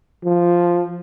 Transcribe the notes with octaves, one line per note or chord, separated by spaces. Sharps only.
F3